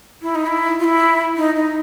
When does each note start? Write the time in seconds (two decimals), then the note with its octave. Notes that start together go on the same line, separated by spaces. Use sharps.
0.22 E4
0.35 D#4
0.47 E4
0.79 F4
0.84 E4
1.37 D#4
1.56 D#4